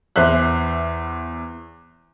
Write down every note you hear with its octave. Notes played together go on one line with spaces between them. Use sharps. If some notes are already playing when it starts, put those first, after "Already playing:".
E2 C5 E5 F#6